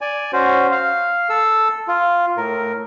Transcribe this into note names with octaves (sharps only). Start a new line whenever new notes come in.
D5 G#5
C#4 F#4 C5
F5
A4 E6
F4
A2 A#4